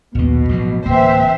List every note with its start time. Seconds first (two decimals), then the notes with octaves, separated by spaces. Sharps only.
0.15 A#1 D#2 B2
0.49 A1 F3 F#3
0.86 D1 E3 A#3 C4 C5 E5